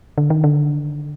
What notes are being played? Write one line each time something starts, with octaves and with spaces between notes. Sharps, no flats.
D3
D#3
D3